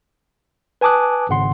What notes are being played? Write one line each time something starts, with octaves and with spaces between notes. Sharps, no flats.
B4 G#5 A5 D6 D#6 F#6
G#1 C#3 F#5 C6